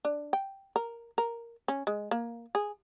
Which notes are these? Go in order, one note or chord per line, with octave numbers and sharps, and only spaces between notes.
D4
G5
A#4
A#4
C#4
G#3
A#3
G#4